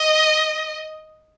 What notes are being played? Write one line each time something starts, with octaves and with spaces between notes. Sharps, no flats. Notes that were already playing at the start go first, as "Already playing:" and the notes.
Already playing: D#5